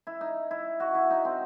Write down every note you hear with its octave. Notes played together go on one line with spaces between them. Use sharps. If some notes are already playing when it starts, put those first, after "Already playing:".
E4
D#4
E4
F#4
E4
D#4
C4